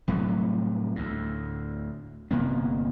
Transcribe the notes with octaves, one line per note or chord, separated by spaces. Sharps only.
C2 A2 F#3 A3
D2 A2
G1 C3 A#3 B3